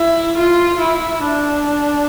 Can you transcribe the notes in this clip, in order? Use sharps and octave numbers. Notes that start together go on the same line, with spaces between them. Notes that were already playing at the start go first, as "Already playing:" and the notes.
Already playing: E4
F4
E4
D4